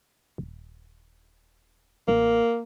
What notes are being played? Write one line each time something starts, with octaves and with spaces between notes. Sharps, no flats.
D#1
A1 A#3